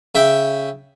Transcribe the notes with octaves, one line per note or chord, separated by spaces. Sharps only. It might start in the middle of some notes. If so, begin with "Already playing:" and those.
C#3 E5 G5